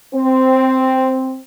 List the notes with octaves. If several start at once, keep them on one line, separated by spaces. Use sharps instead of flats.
C4